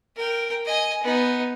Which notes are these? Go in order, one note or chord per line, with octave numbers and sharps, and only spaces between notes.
A#4 G5
D#5 G#5
B3 D#4